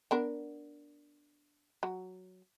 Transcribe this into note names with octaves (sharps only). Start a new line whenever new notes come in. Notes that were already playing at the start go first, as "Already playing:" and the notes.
B3 D4 A#4
F#3